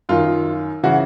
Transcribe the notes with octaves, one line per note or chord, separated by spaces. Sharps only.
F#2 D#3 F4
C#3 E3 F#4